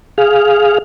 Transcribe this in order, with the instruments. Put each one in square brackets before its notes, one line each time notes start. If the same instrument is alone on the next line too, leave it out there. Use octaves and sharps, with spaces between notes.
[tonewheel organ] G#4 F5